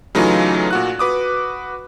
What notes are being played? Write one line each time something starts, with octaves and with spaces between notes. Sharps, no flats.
C#3 E3 F#3 A3 D#4 F4
A#2 F#4 F#6
F#4 B4 D6 D#6